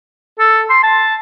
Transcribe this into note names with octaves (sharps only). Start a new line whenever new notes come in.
A4
C6
A5